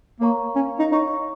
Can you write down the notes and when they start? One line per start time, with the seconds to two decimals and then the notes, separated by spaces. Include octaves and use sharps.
0.20 A#3 A#4 C#5 F5 A#5 C#6
0.56 C#4
0.80 D#4
0.91 D#4 C#5 A#5 C#6